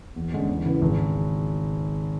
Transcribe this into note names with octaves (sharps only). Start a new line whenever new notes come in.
E2
D3 G#3 C#4
E2
C#3 E3 B3
G#1